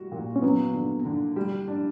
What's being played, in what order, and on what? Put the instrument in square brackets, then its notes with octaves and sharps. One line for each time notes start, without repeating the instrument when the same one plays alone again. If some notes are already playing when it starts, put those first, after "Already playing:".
Already playing: [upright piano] G3 F#4
A#2
[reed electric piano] C#4
[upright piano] F#3 [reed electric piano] B3
[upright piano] D3
D3
G3
D4